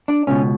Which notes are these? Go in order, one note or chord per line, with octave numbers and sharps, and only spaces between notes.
D4
C#2 B2 C#4